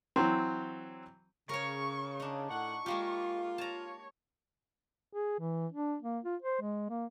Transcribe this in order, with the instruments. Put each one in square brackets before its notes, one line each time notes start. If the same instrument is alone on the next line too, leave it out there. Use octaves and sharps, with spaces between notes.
[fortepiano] E3 F#3 C4
[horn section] C#3 [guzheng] A#4 C#5 [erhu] C#6
[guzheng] D4 D#4
[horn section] A2 A4 F#5 [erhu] C#6
[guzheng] G#3 A#3 G4 [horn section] F4
[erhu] C#5 [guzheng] A5 A#5
[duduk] G#4
E3
D4
A#3
F4
C5
G#3
A#3